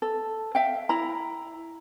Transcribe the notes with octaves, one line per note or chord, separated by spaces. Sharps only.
A4
E5 F5 G5
E4 A#5